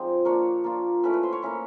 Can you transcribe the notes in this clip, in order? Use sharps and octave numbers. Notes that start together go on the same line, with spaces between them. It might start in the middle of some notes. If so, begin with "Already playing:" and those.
Already playing: F3 G#3 C4 D#4 D5
A#3 D4 F4 C#5
A#3 D4 F4
A3 C#4 E4 B4
B4
C5
C#5
A#3 C#4 E4